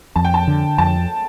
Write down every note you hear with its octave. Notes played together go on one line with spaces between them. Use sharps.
F2 A5
G5
A5
D3
F2 A5